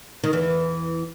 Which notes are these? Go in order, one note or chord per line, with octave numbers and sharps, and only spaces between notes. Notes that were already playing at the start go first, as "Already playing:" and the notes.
D#3
E2 E3